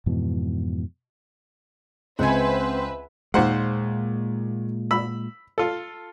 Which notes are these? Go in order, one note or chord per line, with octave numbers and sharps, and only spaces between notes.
F2 G#2 B2 E3
C#2 C4 B4 C5 E5 F#5 G#5
D#2 A#2 G#3 C5 F#5
B5 E6
F4 A4